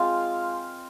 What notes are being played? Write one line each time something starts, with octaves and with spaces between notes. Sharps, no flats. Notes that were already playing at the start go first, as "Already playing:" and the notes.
Already playing: G#3 C4 F4 F5 C6